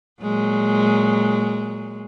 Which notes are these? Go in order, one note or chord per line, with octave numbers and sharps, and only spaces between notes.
A#2 F#3 G#3